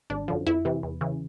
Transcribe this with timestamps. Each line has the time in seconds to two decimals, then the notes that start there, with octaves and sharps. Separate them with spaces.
0.10 G#1 D4
0.28 F#2 D3 F3
0.46 F2 E4
0.65 C3 E3
0.83 E2
1.01 C#3 E3